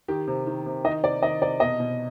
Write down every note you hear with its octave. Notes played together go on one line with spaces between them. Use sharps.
D#3 G4
C3
D#3
C3
D#3 D#5
C3 D5
D#3 D#5
C3 D5
B2 D#5
B2